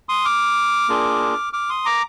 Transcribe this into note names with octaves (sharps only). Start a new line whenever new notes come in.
C6 D#6
D6 F6
A#3 D4 F4 G#4
D6 F6
C6 D#6
A#5 D6